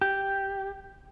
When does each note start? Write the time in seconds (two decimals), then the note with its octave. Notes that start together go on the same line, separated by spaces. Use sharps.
0.01 G4